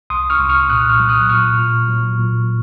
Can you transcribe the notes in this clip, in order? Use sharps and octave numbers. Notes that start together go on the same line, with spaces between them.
C2 C6 D#6
C#6 F6
C2
C#6 F6
A#2 D#6 F#6
C#6 F6
F#3
D#6 F#6
A#2 C#6 F6
A#2
F#3
A#2